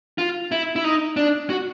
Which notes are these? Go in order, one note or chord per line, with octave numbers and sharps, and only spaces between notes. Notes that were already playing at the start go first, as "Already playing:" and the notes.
F4
E4
E4
D#4
D4
F#4